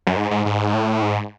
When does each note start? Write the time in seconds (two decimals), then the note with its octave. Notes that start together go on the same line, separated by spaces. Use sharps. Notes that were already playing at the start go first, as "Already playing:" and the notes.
0.07 F#2
0.16 G#2
0.31 G#2
0.46 G#2
0.74 A2
1.02 G#2